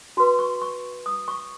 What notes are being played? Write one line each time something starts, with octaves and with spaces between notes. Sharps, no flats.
F#4 B4 C6
C#6
C#6
D#6
C#6